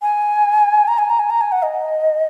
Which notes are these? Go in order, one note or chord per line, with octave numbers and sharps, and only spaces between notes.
G#5
A#5
G#5
A#5
G#5
A#5
G#5
F#5
D#5